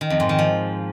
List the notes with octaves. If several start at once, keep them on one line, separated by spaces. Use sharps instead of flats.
D#3
F2
G#2
D#3
F3